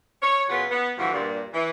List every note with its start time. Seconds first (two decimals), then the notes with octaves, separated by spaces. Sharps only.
0.22 C#5
0.48 F#2 C#3 B3 F4 F5 F#5
0.69 B3
0.97 G2 D3 E3 F3 F#4
1.12 G2 A#2
1.53 E3